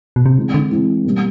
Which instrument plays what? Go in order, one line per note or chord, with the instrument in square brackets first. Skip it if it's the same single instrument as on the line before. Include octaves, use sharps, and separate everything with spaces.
[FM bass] B2
C3
[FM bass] C#3 [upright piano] E3 G#3 C4
[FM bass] D3
[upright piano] E3 G#3 C4
B2 G3 A#3